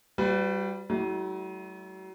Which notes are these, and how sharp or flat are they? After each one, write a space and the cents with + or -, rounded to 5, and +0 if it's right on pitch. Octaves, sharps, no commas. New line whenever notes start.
G3 -10 F4 +45 B4 +35
F#3 +40 A3 -30 E4 -15